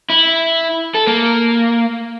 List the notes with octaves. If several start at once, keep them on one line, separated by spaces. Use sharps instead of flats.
E4
A4
A#3